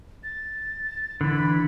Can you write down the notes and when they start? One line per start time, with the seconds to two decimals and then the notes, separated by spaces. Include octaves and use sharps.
0.23 A6
1.21 D3 E3 B5